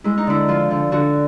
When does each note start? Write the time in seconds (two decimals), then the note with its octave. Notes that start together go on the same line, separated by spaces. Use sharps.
0.04 G#3 E4
0.18 D#4
0.27 D3 E4
0.48 F3 F4
0.71 D3
0.92 D3 F#4